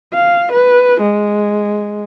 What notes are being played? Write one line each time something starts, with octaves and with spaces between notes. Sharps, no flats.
F5
B4
G#3